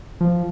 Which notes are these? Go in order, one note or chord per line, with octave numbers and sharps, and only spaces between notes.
F3